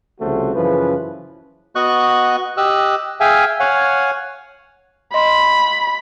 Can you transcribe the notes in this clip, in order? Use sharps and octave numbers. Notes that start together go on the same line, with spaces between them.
C2 C#3 F3 A3 F#4 C5
F#2 C#3 E3 F3 B4
B3 F#4 D#5 C#6 F#6
G4 D#5 E6 F#6
G#4 E5 F5 G5 G#5
C#5 F5 F#5 G#5
D#5 B5 C6